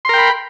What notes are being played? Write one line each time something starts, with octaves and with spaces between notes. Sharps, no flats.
A#4 G5 B5 C6